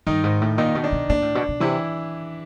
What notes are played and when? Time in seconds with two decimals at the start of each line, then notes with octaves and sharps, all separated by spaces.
0.07 G2 D#3 D#4
0.24 G#2
0.41 A2
0.58 A#2 D#3 D#4
0.75 B2
0.84 D4
0.92 B2
1.09 A#2 D4
1.22 A2
1.35 B2
1.48 B2
1.60 C3 E3 E4